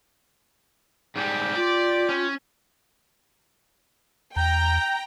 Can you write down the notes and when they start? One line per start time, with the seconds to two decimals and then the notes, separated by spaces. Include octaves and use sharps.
1.16 G#2 G3 G4
1.55 F4 D5
2.09 C#4
4.36 E2 G5 A#5 G6